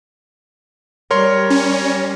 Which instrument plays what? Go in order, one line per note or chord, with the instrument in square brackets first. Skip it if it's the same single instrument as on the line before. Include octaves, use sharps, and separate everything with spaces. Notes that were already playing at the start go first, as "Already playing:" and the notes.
[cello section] G3 [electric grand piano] A#4 C#5 C6
[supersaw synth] C#4